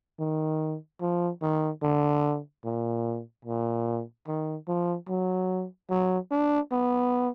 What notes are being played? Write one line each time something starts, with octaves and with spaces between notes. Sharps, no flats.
D#3
F3
D#3
D3
A#2
A#2
D#3
F3
F#3
F#3
D4
B3